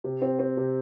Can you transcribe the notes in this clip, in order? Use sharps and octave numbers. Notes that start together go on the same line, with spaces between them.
C3
C4
C4
C3